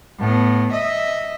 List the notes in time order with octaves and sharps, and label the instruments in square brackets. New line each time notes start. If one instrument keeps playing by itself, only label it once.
[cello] A2 B3
D#5 E5